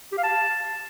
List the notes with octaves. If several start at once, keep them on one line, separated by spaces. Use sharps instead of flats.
G4
F5
A5